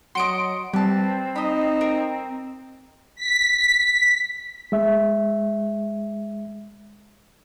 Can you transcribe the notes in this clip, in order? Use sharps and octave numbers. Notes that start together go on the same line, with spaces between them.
F#3 F#4 D#5 C6 D7
G3 C4 B4 A5
D#4 D#5 B5
A#4
B6
G#3 E5